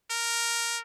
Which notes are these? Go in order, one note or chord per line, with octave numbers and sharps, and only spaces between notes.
A#4